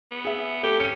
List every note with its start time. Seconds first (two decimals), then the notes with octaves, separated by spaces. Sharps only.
0.11 B3
0.25 G#4 E5
0.63 A3 G4
0.80 C#4 C#7 D#7